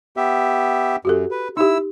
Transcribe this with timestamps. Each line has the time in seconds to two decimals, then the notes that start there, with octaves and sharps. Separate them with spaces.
0.17 B3 G4 E5
1.05 F#2 F#4 G4 A4
1.31 B4
1.57 D#4 E4 G4 E6